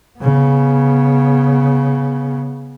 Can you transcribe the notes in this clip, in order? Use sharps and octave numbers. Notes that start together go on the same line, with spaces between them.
C#3 B3